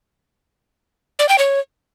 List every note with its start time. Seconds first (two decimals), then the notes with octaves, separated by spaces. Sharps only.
1.19 D5
1.29 G5
1.38 C#5